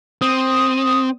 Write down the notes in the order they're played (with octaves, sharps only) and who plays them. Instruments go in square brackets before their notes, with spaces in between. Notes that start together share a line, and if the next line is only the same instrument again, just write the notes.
[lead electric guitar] C4 [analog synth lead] D#6